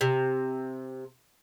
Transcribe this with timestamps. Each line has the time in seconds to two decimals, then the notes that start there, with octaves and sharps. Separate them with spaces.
0.01 C3